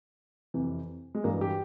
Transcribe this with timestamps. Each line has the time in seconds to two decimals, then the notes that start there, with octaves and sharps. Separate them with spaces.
0.54 F2 C3 E3
1.15 G#3
1.24 G2 E3 A#3
1.41 G4